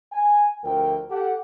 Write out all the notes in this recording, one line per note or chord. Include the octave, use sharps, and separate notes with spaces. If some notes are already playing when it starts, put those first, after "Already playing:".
G#5
D2 F3 A#4 G5
G4 A4 F#5